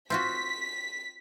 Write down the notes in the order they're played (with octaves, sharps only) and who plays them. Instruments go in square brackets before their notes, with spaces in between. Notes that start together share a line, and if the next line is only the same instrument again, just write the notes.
[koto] C4 F4 F#4 [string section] B6